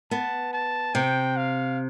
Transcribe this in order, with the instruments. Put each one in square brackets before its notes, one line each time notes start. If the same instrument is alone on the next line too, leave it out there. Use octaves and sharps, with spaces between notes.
[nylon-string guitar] B3 [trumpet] A5
[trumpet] A5
[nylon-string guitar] C3 [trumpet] G5
[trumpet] F5